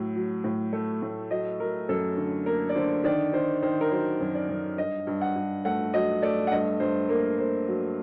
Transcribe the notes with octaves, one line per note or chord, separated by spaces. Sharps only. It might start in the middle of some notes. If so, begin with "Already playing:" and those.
Already playing: A2 F#3
F#3
A2
A3
A2
F#3 D#5
F#3 A#4
F#2 A4
D3
A#3 A#4
D5
D3 C5
D#3 D5
D#3 C5
D#3 C5
A#4
F#3 C5
F#2
D5
F#2
G2 D#5
G2
F#5
G2
A3 F#5
F#3 D#5
A3 D5
F#5
G2 D#5
G2 C5
A#3 A#4
A#3 C5
F#3